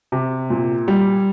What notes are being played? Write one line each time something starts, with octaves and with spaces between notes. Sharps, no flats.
C3
A#2
G3